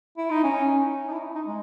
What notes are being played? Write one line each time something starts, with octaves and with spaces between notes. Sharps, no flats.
E4
D#4
C#4
D#4
E4
D#4
G#3